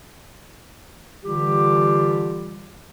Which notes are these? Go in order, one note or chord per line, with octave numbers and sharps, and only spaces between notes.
D3 E3 G3 F4 G4